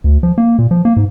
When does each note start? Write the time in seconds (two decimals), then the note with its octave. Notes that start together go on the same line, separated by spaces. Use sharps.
0.04 D2
0.23 F3
0.38 A#3
0.59 A#2
0.71 F3
0.85 A#3
0.97 G#2